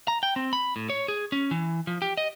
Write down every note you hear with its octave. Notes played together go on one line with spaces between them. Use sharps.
A#5
G5
C4
B5
A2
C#5
G#4
C#4
E3
F3
G4
D#5